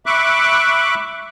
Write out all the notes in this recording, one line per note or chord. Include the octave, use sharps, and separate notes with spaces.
E5 B5 C#6 D6 F#6